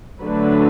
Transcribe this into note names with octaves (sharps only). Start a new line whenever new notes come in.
D3 F#3 A3 D4 B4